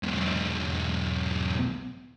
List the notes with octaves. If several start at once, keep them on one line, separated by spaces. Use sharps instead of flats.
B1 E2